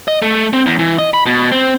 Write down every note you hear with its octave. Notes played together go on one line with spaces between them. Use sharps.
D#5
A3
C4
E2
E3
D#5
B5
B2
C4